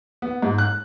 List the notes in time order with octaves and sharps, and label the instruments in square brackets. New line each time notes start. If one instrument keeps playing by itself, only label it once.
[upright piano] B3
G#2
F#6